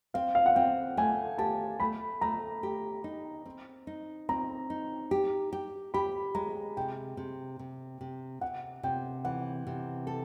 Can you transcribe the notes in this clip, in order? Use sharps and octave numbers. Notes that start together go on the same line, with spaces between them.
C4 F5
F5
F#5
C4 G5
A3 G#5
G4 A5
A3 B5
A3 A#5
G4
D#4
C4
D#4
C4 A#5
D#4
G4
G4
G4 B5
G#3 A#5
C3 G5
C3
C3
C3
C3 F#5
C3 G5
E3 F#5
C3
A4